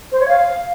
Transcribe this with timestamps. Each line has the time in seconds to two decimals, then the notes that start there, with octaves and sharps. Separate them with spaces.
0.12 C5
0.20 C#5
0.28 F5